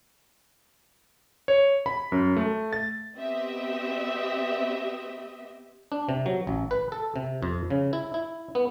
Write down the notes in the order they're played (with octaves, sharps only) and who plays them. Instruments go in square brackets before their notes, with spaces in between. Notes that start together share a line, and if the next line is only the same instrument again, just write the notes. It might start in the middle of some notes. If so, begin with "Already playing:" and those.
[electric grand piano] C#5
B5
F#2
A3
A6
[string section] B3 C4 G4 D#5 E5
[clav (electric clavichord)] D4
C3
F#3
A1
B4
A4
C3
F2
C#3
E4
E4
B3